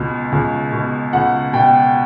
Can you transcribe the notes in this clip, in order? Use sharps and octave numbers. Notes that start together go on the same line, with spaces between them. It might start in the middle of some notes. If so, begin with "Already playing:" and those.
Already playing: C#2 B2
C#2
B2
C#2 F#5
B2 G5